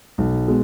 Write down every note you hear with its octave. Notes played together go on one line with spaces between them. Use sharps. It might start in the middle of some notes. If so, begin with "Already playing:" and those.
B1
B2 G#3